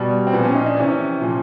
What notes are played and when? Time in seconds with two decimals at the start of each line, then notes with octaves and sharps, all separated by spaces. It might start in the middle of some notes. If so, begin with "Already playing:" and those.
Already playing: B2 G3
0.27 C4
0.33 A#2 F3 B3
0.44 C#4
0.55 D#4
0.66 D4
0.77 C3 E3 C#4
1.21 A#2 F3